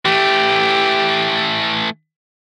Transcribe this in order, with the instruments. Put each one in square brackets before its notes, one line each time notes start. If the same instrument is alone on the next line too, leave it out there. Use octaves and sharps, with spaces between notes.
[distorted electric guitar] E3 A3 [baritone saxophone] G4